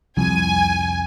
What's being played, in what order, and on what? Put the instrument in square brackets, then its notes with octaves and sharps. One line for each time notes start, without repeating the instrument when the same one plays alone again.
[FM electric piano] C2 F2 [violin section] G#5